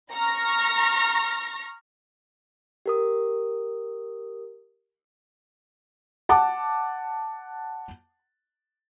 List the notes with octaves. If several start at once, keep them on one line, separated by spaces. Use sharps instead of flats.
A#5 C#6 F6 A#6
G4 A#4 D#6
F#5 A5 D6